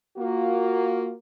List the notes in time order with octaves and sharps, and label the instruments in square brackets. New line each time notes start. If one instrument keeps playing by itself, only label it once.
[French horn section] A#3 F4 F#4